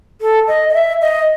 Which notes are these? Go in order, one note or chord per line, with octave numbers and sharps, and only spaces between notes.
A4
D#5
D#5
E5
D#5